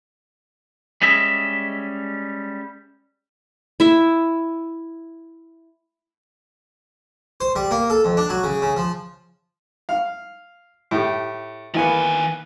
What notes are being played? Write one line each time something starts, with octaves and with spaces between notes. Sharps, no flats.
G3 G#3 C#4 D#5 E5
E4 E5
C5
G3
A#3
A4
F2
D4
F#3
C#3
C#3
F3
F5
A2 G4
D#3 E3 A#3 B3 G#5